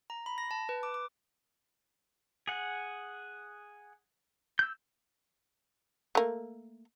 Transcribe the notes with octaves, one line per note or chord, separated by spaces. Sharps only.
A#5
B5
A#6
A5
B4
D6
D6
G#4 F#5
E6 G6
A3 A#3